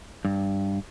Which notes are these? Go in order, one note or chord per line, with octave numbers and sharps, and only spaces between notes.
G2